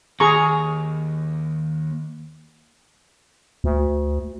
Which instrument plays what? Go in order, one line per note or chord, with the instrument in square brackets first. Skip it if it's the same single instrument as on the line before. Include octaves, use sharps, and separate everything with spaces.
[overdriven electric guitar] D#2 [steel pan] G#4 A#5 C#6
[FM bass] D2